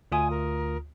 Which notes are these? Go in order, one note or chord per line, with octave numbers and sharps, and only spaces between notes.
D2 F4 G#5 D#6
A#4